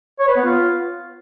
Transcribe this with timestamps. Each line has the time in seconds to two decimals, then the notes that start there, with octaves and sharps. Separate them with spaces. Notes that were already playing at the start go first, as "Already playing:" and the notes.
0.19 C#5
0.28 B4
0.36 B3
0.45 F4